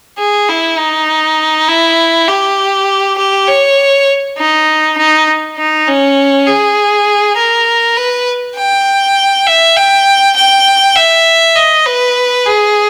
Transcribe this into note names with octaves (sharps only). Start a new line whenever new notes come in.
G#4
E4
D#4
E4
G4
G4
C#5
D#4
D#4
D#4
C#4
G#4
A#4
B4
G5
E5
G5
G5
E5
D#5
B4
G#4